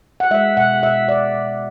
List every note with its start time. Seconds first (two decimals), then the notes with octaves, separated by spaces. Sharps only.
0.20 F#5
0.31 G#3 E5
0.57 B2 F#5
0.83 B2 E5
1.08 B2 D5
1.34 B2